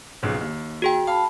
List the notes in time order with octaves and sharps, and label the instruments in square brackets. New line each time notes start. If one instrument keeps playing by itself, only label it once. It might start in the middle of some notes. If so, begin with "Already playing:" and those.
[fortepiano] B1 F2 C#3
D#2
[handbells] F#4 G#4 G5
[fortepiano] F5 [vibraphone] A5 B5